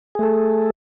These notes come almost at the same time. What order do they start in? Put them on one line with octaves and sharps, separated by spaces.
G#4 A3 A4